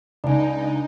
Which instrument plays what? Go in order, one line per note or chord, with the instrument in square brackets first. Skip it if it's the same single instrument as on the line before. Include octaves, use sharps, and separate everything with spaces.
[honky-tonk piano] C#2 [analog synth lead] D4 [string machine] D#4 [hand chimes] D5 G#5